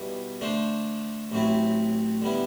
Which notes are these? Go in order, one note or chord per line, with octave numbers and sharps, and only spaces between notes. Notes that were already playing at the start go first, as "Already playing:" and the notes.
Already playing: B2 G3 B3 E4
D3 A3 D4 A4 C5
A1 A2 F#3 C4 E4
D3 G3 B3 E4